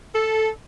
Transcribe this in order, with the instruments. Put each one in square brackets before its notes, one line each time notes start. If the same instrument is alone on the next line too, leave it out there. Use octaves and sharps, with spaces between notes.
[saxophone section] A4